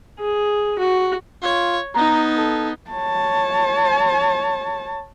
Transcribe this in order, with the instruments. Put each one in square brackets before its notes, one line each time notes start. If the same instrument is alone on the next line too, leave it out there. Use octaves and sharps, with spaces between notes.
[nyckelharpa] G#4
F#4
[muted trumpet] F4 [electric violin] C#5
[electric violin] B3 D#4 [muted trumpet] A#5
[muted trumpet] A4
[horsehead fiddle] C#5 A5